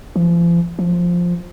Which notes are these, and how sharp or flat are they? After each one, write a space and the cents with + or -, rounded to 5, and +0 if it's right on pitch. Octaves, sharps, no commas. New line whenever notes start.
F3 -40
F3 +5